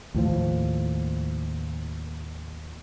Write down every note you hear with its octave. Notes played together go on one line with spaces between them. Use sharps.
D#2 A2 F3